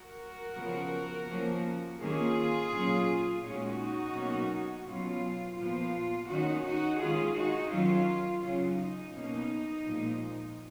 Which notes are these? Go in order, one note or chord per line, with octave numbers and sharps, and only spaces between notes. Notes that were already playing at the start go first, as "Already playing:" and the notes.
Already playing: F#4 A#4
C#3 F3 B3
F3 A#3 C#4
D#3 A#3 C#4 F4 G#4
A#2 F#3 C#4
A#2 G#3 C#4 D#4 F#4
B2 F#3 A#3 C#4
B2 F#3 C#4 F4
A#2 F3 B3 F4
D#3 A#3 C#4 D#4 F#4
D#4 F#4
D#3 G#3 C#4 F4 G#4
D#4 F#4
D#3 F#3 C#4 F4
C#3 F#3 C#4 F4
D#4
B2 A#3 C#4
A#2 F3 G#3